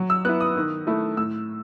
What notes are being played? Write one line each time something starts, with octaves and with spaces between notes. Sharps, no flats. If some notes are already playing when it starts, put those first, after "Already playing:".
Already playing: F#3
E6
B3 E4 F#6
D#6
D#3
A3 E4
A2 E6